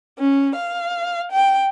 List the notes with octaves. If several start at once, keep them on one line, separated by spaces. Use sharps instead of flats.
C#4
F5
G5